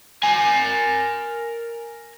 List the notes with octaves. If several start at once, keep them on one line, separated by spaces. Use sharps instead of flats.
A#4 G#5